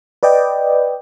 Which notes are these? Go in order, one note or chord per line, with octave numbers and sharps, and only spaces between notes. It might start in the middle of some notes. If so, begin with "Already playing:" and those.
B4 D5 D#5 G5